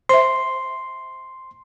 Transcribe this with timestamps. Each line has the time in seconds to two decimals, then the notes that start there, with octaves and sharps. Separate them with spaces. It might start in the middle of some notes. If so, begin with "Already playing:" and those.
0.09 C5 E5 C6